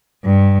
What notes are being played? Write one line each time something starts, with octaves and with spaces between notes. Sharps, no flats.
G2